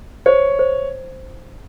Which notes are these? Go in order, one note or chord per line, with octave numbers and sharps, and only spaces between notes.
C5 C#5
C5